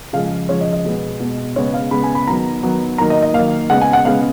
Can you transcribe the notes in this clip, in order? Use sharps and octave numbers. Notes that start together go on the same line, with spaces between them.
C#3 F3 G#3 F5
C#3 F3 G#3 C#5
D#5
D#5
B2 G#3 B3
B2 G#3 B3
C#3 G#3 B3 C#5
F5
C#3 G#3 B3 B5
G#5
B5
D#3 F#3 B3 A#5
D#3 F#3 B3
D#3 F#3 A#3 A#5
D#5
D#5
D#3 F#3 A#3 F5
C#3 G#3 B3 F#5
G#5
F#5
C#3 G#3 B3 F5